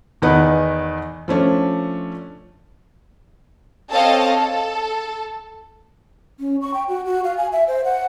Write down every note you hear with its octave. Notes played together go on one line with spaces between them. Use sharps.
E2 D#3 D#4 B4 F#5 G#5
F3 A3 C#4 D4
C4 A4 C#5 D#5 F5 A5
A4
C#4
C#6
G5
F#4
F#4
F5
G#5
E5
C5
F#5